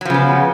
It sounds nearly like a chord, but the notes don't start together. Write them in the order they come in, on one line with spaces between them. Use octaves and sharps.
F#3 F3 C#3 B3